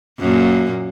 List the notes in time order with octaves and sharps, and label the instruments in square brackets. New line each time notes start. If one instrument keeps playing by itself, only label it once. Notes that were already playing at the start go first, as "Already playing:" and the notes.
[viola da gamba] F#2 A#2 A#3